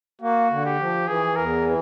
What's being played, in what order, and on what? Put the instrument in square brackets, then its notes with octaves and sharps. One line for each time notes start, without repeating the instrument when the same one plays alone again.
[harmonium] A#3 [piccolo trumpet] F#4
[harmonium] D3
[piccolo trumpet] G4
[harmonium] F3
[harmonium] E3 [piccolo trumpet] G#4
[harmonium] E2 [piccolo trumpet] A#4
[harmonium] E3